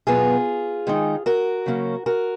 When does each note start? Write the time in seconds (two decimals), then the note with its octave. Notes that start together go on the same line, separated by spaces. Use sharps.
0.07 B2 F#3 B3 F4 G#4
0.87 D#3 G#3 D#4
1.26 F#4 A#4
1.66 C#3 F#3 A#3 C#4
2.06 F#4 A#4